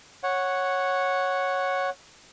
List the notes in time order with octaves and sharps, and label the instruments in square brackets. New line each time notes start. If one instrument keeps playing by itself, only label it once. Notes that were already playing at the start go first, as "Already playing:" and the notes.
[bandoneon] C#5 F#5